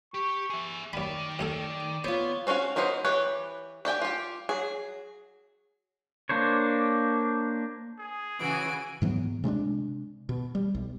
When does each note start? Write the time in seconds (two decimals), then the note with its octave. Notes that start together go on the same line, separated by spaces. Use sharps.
0.14 G4 C#6
0.50 G#4 E5
0.93 F#2 D#3 D5 B5
1.39 F#2 C#4 A4 D5
2.04 B3 F4 C5 C#5
2.47 C4 C#4 F#4 A4 F5
2.76 F#3 B3 F4 C5 D#5
3.05 E3 G4 B4 C#5
3.85 G4 D5 G5 G#5
4.02 F4 G4
4.49 F#3 G#4
6.29 A#3 D4 C5 C#5
7.99 G#4
8.40 C#3 E3 F#4 G#5 D7
9.02 G#2 E3 F#3 B3
9.44 C3 G#3 B3 D4
10.29 B2
10.55 G3
10.75 B1